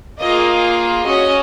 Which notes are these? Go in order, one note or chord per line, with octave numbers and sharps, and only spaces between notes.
A#3 F4 G#4 D#5
C#4 F#4 D#5